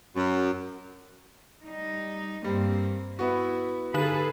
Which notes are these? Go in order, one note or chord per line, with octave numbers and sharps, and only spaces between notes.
F#2
G3 D#4
G2 G3 A#3 C4
B3 E4 F#4
D3 D#4 G#4 A4 B4 F#7